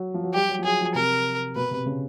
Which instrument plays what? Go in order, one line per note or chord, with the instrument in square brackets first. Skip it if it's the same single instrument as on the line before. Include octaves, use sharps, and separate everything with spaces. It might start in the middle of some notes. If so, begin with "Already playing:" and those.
Already playing: [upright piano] F#3
F3
F#3
[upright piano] G3 [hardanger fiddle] G4
[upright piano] F#3
F3
[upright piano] F#3 [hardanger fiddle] G#4
[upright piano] F3
[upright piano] C3 [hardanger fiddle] A#4
[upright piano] B2 [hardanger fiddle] B4
[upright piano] C3
C#3